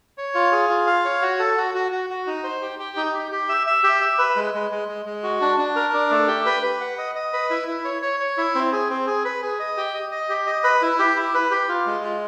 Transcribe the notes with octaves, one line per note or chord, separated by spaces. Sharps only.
C#5
F4
G#4
F4
F5
C#5
F#4
A4
F#4
F#4
F#4
F#4
D#4
C5
G4
G4
D#4
G4
G4
E5
E5
G4
E5
B4
G#3
G#3
G#3
G#3
G#3
F#4
D4
D4
A#4
D4
A3
G4
B4
B4
F#5
D#5
D#5
B4
E4
E4
C#5
C#5
C#5
E4
C4
G#4
C4
G#4
B4
G#4
D#5
G4
D#5
D#5
G4
D#5
B4
E4
G4
E4
B4
G4
F4
G#3
F4